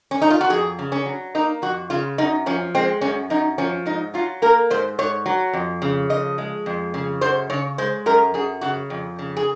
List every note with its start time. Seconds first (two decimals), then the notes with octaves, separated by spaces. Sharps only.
0.11 C#4
0.22 D#4
0.30 F4
0.41 F#4
0.50 F2 G#4
0.79 C#3
0.92 C#4
1.06 F#3
1.35 A#3 D#4
1.62 F2 F#4
1.90 C#3 F4
2.18 F#2 D#4
2.46 F3 C#4
2.75 G#3 C4
3.01 F#2 C#4
3.30 F#2 D#4
3.58 F3 C#4
3.86 G#2 D#4
4.14 F#3 F4
4.42 A#3 A#4
4.70 G#2 C5
4.99 G#2 C#5
5.26 F#3
5.53 F2
5.82 C#3
6.10 F3 D#5
6.38 G#3
6.66 F2
6.94 C#3
7.21 F#2 C5
7.50 C#3 C#5
7.78 G#3 C5
8.06 F#2 A#4
8.34 F#2 G#4
8.61 C#3 F#4
8.90 F2
9.19 C#3
9.37 G#4